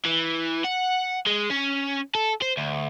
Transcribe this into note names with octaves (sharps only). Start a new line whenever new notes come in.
E3
F#5
G#3
C#4
A4
C5
D2